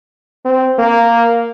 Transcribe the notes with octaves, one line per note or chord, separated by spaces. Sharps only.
C4
A#3